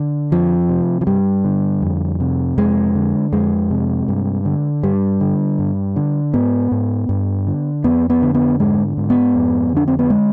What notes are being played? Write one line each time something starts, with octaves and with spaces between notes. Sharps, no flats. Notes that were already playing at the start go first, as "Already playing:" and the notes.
Already playing: D3
F2 F3
C3
F3
G2 G3
D3
F2
C3
F2 G#3
D3
F2 G#3
C3
G2
D3
G2 G3
D3
G2
D3
G#2 B3
G#2
G2
D3
F2 B3
B3
D3
B3
G#2 G#3
G#2
B3
F2
D3 D4
C4
B3
G#3